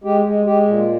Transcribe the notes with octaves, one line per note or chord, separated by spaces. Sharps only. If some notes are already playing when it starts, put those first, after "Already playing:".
G#3 G4
G#3
G#3 G4
A#2